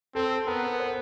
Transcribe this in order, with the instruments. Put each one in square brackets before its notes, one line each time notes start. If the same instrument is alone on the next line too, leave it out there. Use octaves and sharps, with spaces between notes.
[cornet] C4 [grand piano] A4
[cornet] B3 [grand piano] A#4
[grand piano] B4
C5